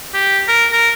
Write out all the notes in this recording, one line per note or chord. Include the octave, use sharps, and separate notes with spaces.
G4
A#4
A#4